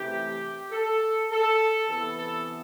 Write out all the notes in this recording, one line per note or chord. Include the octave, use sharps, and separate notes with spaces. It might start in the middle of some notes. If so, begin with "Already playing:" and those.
Already playing: C3 E3 A3 G4
A4
A4
C3 E3 B3 A4
A4